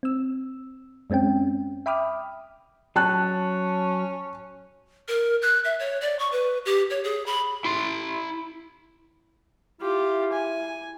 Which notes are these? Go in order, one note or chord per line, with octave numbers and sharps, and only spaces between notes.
C4 E6
F#2 G#3 C4 C#4 G5
E5 G5 B5 D6 D#6 F6
F#3 C#4 A5 F#6
A#4
F#6
E5
C#5
D5
C#6
B4
G4
C#5
G#4
B5
E4 C6
E4 F4 G4
G#5